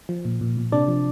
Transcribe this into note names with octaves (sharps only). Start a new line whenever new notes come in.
F3
A#2
A#2
A#2
C3 D4 D5
F3